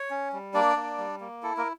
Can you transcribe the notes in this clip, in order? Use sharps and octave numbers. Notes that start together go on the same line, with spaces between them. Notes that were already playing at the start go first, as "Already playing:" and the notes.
Already playing: C#5
C#4
G3
A#3 D4 D5
A#3
G3
A#3
E4 A4
A#3 A#4